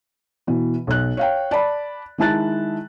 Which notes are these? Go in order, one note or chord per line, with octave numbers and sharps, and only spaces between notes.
B2 E3
B1 F#6
C#5 F5 G5
D5 A5 B5
D#3 G#3 E4 A5 F#6 A6